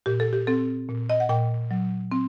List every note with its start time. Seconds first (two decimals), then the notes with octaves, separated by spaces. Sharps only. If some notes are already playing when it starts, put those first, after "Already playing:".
0.06 A#2 G4
0.20 A4
0.33 G4
0.47 C4 A4
0.89 A#2
1.10 D#5
1.20 F#5
1.29 A#2 G5
1.71 F#3
2.12 C4